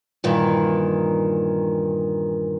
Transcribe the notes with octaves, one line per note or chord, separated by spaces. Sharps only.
G2 A#2 D#3 E3